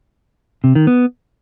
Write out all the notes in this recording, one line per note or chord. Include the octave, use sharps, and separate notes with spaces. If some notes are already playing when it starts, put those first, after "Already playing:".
C3
D#3
B3